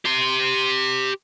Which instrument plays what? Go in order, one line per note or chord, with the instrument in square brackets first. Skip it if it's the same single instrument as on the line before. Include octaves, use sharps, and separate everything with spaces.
[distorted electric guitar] G4 C6